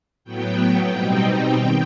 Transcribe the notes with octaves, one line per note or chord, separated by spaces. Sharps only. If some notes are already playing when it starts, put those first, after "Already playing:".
A2 F#3 B3 G5
B2 G3 C4 D#4
D#3 G5